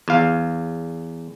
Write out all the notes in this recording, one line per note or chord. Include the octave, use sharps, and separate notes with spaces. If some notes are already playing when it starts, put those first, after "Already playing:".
E2 F5